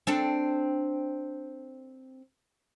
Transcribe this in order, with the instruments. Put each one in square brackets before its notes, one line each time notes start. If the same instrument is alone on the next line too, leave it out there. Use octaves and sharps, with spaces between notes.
[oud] C4 D4 A4